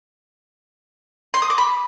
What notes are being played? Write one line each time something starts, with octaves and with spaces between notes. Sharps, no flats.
C6
D#6
D6
B5